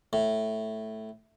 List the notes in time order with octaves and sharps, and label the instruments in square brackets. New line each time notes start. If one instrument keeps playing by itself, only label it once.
[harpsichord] A2